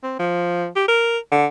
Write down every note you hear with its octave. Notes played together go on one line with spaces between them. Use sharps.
C4
F3
G4
A#4
D3